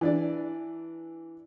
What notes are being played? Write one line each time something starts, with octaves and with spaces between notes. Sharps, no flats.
E3 D4 D5